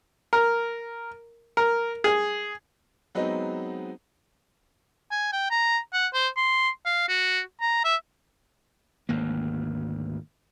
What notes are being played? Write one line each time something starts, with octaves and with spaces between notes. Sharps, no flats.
A#4
A#4
G#4
F#3 G#3 B3 C4 D#4
G#5
G5
A#5
F#5
C5
C6
F5
F#4
A#5
E5
G#1 D2 A#3